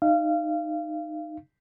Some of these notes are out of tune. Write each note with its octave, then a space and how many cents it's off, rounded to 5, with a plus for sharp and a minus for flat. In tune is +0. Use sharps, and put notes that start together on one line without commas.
D#4 -15 F5 -25